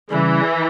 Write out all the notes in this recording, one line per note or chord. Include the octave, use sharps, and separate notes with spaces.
C#3 E3 G3 C#4 E4